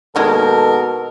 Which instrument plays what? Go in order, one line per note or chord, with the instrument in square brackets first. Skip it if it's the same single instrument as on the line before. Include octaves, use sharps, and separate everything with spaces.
[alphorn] B2 [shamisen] D#3 G#3 A#3 [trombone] A4 [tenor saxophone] A#4